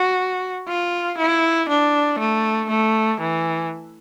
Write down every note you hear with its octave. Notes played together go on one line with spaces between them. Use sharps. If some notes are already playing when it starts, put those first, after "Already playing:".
Already playing: F#4
F4
E4
D4
A3
A3
E3